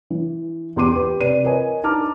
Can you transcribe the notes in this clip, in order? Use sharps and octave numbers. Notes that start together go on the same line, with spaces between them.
E3
E2 G4 C6 D6 D#7
G4 B4
C3 B4 D5 D#7
A#4 B4 C#5 D#5 G#5
D4 D#4 A5 A#5 D6 F6